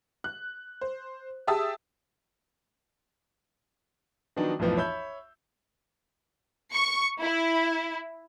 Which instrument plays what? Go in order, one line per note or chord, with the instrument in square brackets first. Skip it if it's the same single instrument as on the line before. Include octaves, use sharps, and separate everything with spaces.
[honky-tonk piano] F#6
C5
G4 G#4 E5 A5 D#6 E6
[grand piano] D#3 F3 F#3 B3 D4 D#4
B1 F2 A2 E3 F3 B3
C#5 E5 B5 E6 G6
[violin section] C#6
E4